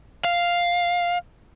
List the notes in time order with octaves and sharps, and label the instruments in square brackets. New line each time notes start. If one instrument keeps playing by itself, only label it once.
[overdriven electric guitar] F5